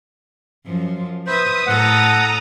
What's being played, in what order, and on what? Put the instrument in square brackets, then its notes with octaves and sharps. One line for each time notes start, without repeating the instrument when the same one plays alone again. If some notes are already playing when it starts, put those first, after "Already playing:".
[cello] F#2 F3
[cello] B4 E5 [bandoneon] C5 [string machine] D#6
[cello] A2 A4 [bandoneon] F#5 [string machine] A#5 D#6